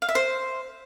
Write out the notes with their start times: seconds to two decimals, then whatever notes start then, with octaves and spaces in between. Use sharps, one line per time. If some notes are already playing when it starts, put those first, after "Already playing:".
0.02 F5
0.09 E5
0.15 C5